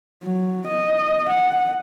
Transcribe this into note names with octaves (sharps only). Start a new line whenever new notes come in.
F#3
D#5
F#5